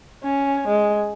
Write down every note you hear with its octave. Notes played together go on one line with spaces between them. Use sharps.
C#4
G#3